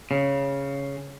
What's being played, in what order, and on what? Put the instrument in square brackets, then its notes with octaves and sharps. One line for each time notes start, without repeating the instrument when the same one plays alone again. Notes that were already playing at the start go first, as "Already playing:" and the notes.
[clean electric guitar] C#3